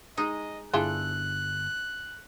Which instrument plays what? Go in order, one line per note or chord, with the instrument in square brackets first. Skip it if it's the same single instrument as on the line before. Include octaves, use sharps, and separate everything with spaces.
[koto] G#3 D#4 G#4 [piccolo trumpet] D#5
[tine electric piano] G1 [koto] D4 A4 [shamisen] E4 F4 G#4 [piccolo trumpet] F#6